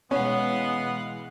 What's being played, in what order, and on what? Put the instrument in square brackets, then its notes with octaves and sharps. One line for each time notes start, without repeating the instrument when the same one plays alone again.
[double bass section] B2 E3 G#3 [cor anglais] B3 [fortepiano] C#4 [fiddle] F5 F#5